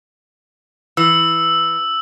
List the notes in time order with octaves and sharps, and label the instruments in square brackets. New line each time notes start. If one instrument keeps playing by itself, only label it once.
[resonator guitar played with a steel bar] E3 [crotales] E6